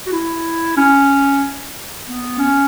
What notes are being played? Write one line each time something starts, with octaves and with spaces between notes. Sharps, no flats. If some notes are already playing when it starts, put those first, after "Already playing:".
F#4
E4
C#4
B3
C#4